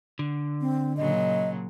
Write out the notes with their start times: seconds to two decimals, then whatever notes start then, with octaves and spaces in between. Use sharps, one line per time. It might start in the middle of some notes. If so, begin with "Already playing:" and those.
0.19 D3
0.61 C4
0.97 A#2 C#3 F#3 D#5